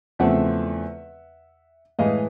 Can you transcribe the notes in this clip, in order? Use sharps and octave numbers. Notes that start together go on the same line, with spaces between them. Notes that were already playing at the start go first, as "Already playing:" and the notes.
E2 C#3 F3 A3 C4 E5 F#5
A2 E3 G#3 D#5 F5